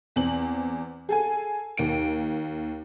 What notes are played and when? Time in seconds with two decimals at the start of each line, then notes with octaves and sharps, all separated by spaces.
0.16 E2 C4 F#7
1.09 G#4 A4 G#5
1.77 D#2 D7